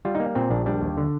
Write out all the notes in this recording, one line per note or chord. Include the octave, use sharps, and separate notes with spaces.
G3 F4
A#3 D#4
A#2 C4
A#1 D4
G3 D4
D#2
D3